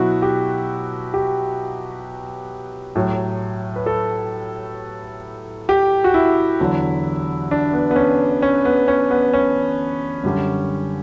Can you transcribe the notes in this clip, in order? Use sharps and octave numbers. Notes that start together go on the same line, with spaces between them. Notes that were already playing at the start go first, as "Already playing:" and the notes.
Already playing: B2 F#3 E4 F#4
G4
G4
A2 F#3
B4
A4
G4
F#4
E4
E2 D3 F#3
D4
B3
B3
C#4
C#4
B3
C#4
B3
C#4
F#2 D3 G3